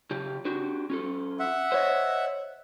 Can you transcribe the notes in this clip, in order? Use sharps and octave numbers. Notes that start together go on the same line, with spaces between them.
C#3 F4 G4
D4 F#4 G4
C#4 F4 A4
E5 F#5
C5 C#5 D#5